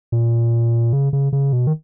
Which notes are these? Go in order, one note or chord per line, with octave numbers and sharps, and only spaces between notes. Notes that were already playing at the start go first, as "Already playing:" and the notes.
A#2
C#3
C#3
C#3
B2
D#3